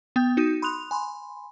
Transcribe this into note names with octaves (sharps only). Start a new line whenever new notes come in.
B3 G5 G6
D#4 F#4 D#6 G6 D#7
B5 C6 D#6 F#6 F7
G#5 B5 C6